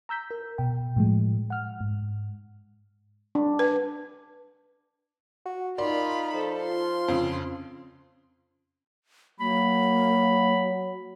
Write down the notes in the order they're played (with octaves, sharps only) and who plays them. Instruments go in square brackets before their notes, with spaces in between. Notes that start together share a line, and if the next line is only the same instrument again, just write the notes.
[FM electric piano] A#5 E6 G6 B6
A#4
B2 G5
A2 F3 G#3
F#5 F6
G#2
[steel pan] D4
[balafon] B4
[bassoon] F#4
[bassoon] A#2 [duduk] D#4 [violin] F4 B5 [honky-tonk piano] D5 C6
[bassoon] F3 [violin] A4
[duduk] F4 [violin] C6
[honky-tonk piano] F2 C#3
[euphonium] F#3 [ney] A#3 [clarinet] B5